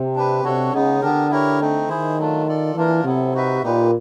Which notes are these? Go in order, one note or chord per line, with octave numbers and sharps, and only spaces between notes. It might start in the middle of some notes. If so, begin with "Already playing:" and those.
Already playing: C3
D4 G4 B4
C3 D4 F#4 A4 C#5
C#3 G#3 B3 D#4
D3 B3 D4 G4 A#4
E4 G4 A#4 C#5
A3 C4 D#4
D#3 E4 G#4 C5
F#3 A3 D4 F4
F4 A4 D5
E3 A#3 D4 F4 A#4
C3 F#3 B3 E4 A4
D#4 F#4 B4 E5
A#2 D#4 G4 B4